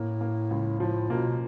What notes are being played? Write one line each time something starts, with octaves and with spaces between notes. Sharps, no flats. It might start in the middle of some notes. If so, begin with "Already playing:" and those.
Already playing: A2 A#3
A#3
C#2
A2 F3
B2 A#3